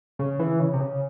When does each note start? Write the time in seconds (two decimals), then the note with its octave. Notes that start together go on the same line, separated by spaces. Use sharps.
0.19 C#3
0.39 E3
0.60 C#3
0.73 C3
0.80 C#3